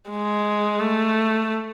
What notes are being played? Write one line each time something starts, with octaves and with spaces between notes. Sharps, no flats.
G#3
A3